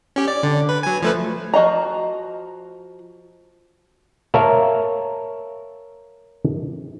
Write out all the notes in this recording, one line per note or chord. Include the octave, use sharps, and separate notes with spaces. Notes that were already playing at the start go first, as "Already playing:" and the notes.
C#4 G4
D5
D3
B4
F#3 G#5
F3 A3 B4
F3 F#4 D#5 A#5
A#4 C#5 E5 F5 A5 A#5